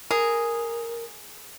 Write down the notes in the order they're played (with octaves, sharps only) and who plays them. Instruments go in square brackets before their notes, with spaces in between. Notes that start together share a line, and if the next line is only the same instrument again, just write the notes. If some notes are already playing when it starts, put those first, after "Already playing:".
[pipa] G#4 [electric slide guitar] A#4